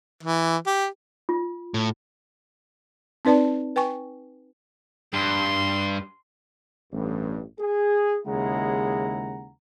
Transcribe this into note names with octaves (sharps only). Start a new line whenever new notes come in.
E3
G4
F4
A2
C4 D#4 B4 D5 A5
B4 G5 G#5 C#6
G2 C6
A1 G2
G#4
D#2 C#3 G#3 E4 F#5 A#5